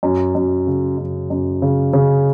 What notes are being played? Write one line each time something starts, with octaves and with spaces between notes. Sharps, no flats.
F#2
F#2
C#3
F#2
F#2
C#3
C#3